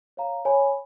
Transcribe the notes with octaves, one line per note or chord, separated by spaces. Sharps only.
C#5 F5 A#5
C#5 G#5 B5